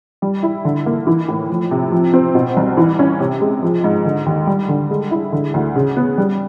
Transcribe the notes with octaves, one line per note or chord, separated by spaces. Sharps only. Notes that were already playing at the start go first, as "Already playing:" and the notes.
G3
E4
D3
A#3
E3
A2
F3
C3
F3
C4
B2
C2
E3
C#4
C3
G#3
F3
G#2
D3
D#2
G3
D3
G#3
E4
D3
D2
C#3
B3
G3